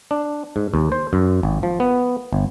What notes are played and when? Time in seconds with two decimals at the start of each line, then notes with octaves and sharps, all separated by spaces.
0.11 D4
0.56 G#2
0.74 D#2
0.92 C5
1.13 F#2
1.43 G#1
1.63 F3
1.80 B3
2.33 G1